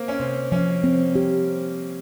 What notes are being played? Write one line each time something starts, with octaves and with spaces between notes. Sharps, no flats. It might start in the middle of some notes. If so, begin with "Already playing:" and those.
Already playing: A#3 C4
C#4
C3 C4
F3 C#4
C4
G4